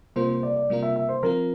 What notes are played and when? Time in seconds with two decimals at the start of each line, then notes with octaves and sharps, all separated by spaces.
0.16 C3 G3 A#3 F4 A#4 C5
0.29 C5
0.43 D5
0.56 D5
0.70 C3 G3 A#3 F4 A#4
0.83 E5
0.96 E5
1.09 C5
1.23 F3 C4 F4 A#4